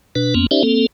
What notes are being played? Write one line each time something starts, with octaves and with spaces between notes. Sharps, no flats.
B2 D4 B4
F2 A#3 B3 C#4
C#4 D#4 G4 C5 D5 E5
A#3 C4 A4